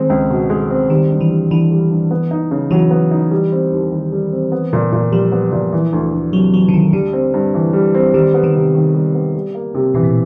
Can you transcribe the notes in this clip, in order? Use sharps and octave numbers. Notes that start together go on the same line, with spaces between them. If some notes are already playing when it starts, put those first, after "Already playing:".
Already playing: D#3 G#3 C4
C#2
B2
G#3
C4
D#3 G3
G2
E3
G2
D3 E3
G3
G2
B3
D#4
C#3
E3 F#3
B3
D#4
G3
C4
D#2
D#3
G3
C4
B3
A#2
A#2
F3 G3
B3
A#2
E3
D2
D2
C3 F#3
E3 F#3
D3
D2 D#3
D3 G3
C4
G2
E3
G3
C4
D#3 G3
B3
D#3
C3
D#3
G3
B3
G3
A#3
C3
B2 E3
A#2